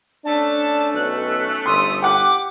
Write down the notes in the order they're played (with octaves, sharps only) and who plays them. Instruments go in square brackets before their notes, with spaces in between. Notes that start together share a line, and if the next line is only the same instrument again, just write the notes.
[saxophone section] A3 C#4 [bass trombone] D4 [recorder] A5
[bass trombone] B1 [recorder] F#6
[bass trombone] G1 [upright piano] C6 [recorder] D#6
[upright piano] G4 F#5 [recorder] D6